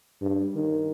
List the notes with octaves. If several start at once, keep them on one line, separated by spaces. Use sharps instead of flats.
G2
D#3